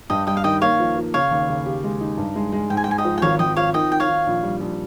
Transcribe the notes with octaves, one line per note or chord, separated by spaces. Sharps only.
G2 D#5 G5
G3 D#5 G5
F5
D#3 D#5 G5
A#3 C#5 F5
F3
F3
C#3 C#5 F5
D#2
C#3
G4
G#3
D#4
G2
G#3
G#3
G#2 G5
G#5
G5
G#2 G#5
D#5 G5
F3
G5
G#1 C#5 F5
G#1 D#5 G5
F3 C#5 F5
D#3 D#5 G5
D#3 G5
C#5 F5
D#3
A#1
G3
A#1